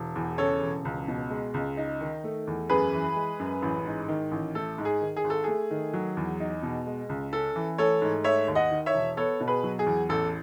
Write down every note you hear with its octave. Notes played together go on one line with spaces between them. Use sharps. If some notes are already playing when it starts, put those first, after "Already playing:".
Already playing: E1
E2
C#3 A4 C#5
E1
C#2
B2
G#3
C#2
D#4
D#3
A3
E2
F#2 G#4 B4
E3
G#3
F#2
A1
G#2
D#3
A1
A3 A4
G#2
G#4
D#3
G#4
G#1
A4
A3 G#4
D#3
F#3
E2
D#4
B2
G#3
C#2
C#4 A4
E3
A3 A4 C#5
G#2
A3 C#5 E5
D#2
D#5 F#5
D#3
C#5 E5
E1
B3 A4 C#5
B2
G#4 B4
F#3
G#4
E2
A1 A4